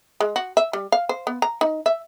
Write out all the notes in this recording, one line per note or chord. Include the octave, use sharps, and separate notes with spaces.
G#3
F#4
E5
G3
F5
C5
B3
A#5
D#4
E5